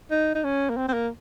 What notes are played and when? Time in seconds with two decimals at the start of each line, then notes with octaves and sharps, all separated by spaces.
0.11 D#4
0.35 D#4
0.44 C#4
0.70 A#3
0.77 C4
0.88 C4
0.93 A#3